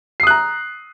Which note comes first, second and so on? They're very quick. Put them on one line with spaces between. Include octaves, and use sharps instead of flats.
C7 D#6 F#6 A#5